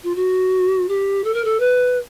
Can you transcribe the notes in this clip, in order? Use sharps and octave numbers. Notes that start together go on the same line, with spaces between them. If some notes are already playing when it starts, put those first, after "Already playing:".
F4
F#4
G4
A4
A#4
A4
B4